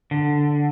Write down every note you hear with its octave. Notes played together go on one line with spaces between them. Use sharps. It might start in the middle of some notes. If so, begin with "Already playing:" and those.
D3